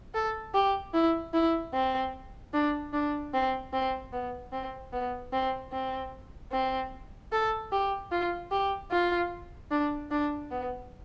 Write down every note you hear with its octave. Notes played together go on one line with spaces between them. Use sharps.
A4
G4
E4
E4
C4
D4
D4
C4
C4
B3
C4
B3
C4
C4
C4
A4
G4
F4
G4
F4
D4
D4
B3